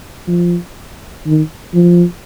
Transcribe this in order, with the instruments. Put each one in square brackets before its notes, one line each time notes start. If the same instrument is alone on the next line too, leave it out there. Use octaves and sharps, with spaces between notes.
[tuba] F3
D#3
F3